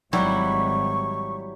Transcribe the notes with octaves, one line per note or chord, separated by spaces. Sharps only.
G#1 F#3 G3 E4 C#6